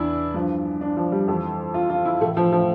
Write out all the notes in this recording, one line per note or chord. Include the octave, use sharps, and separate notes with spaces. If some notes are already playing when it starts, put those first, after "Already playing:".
Already playing: E2 E3 D4 E4
G2 F3
D4
F3
G3
F2 E3
F4
F4
E4
A2 E3 A3
F3
F3